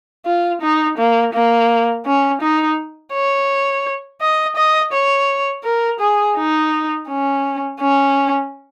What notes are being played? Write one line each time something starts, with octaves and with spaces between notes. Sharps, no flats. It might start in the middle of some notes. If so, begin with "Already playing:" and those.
F4
D#4
A#3
A#3
C#4
D#4
C#5
D#5
D#5
C#5
A#4
G#4
D#4
C#4
C#4